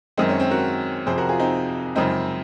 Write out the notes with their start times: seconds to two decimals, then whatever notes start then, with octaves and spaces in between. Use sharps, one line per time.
0.18 F#2 D#3 G#3 C4
0.29 C#4
0.40 C4
0.50 F#4 A#4
1.06 F2 C3 F3 G#4 C5
1.18 F#4 A#4
1.29 F4 G#4
1.40 C4 D#4
1.96 F#2 C#3 F3 G#3 C4 D#4